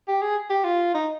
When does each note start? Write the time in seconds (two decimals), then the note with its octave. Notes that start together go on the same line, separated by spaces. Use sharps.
0.08 G4
0.22 G#4
0.50 G4
0.64 F4
0.94 D#4